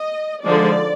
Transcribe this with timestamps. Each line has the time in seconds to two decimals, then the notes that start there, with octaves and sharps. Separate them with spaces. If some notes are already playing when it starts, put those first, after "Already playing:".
Already playing: D#5
0.43 D3 F3 G#3 D#4 D5